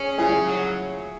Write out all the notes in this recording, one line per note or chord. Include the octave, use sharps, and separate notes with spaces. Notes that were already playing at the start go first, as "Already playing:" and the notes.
Already playing: C#4 G#4
C#3 E4 G#4
F#3